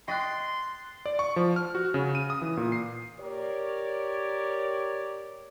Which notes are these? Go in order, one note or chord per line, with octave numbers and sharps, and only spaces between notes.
D#5 G5 C6 C#6 F#6 A6 C7
D5
C#6
F3
F6
F#4
C#3
D#7
D#6
E3
A#2
C7
G4 A#4 C#5 D5